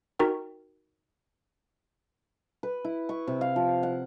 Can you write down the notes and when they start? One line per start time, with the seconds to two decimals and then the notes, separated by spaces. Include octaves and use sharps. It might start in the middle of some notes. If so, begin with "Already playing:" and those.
0.19 D#4 F#4 A#4 G5
2.63 B4
2.84 E4
3.09 C#6
3.27 C3
3.41 F5
3.56 F3
3.83 F#5